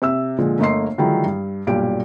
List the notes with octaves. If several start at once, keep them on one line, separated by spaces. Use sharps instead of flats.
C3 E5 E6
A#2 D3 F3 G#3
G1 A3 A#3 D#5 C6 C7
D3 D#3 F3 F#3 G#3 E4
G2
B1 G2 A#2 D4 G4 D7